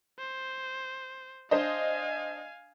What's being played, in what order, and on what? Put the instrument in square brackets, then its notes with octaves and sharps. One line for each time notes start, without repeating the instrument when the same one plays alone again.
[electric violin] C5
[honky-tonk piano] D4 C5 D#5 [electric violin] F5 G#5